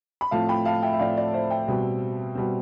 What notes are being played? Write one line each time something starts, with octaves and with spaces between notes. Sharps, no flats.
B5
A2 F3 C4 F5 A5
G5 B5
F5 A5
E5 G5
E5
A2 F3 C4 D5 F5
D5
C5 E5
E5 G5
B2 G3 C4
B2 G3 C4